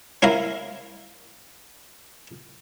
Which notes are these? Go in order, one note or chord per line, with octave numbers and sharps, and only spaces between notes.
C#4 E4 A#4 F5